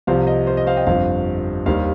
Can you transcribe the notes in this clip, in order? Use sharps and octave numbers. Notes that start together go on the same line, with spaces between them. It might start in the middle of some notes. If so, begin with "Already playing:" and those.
C2 C3 F3 C4 C5 F5
D#5
C5
D#5
C5 F5
D#5 G5
G1 F2 F3 C5 F5
D#2 D#3 G3 C5 F5